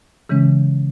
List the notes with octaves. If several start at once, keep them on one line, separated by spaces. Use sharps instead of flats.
C#3 E3 G#3 C#4